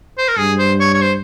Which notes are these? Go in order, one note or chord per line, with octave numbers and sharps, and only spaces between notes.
C5
A#4
G2 G#4
C5
C#5
C#5
C5